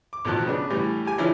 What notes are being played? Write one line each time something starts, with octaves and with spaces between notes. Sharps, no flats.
D6
A1 B2 D#3 F3 A5 F#6
C#3 B3 D4
A2 E3 G3
G4 G#5
C#3 E3 F3 C#4 D4 E4